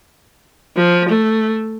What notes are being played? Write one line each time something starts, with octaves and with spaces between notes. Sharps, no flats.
F3
A3